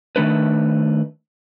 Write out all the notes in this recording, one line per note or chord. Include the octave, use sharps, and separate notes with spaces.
D#3 A3 D4 B4